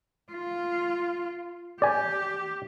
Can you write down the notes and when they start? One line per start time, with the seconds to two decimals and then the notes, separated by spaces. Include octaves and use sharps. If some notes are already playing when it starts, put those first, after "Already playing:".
0.32 F4
1.82 G4 D5 G#5